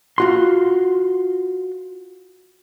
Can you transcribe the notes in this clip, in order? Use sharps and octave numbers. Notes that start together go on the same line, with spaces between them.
F4 F#4 C6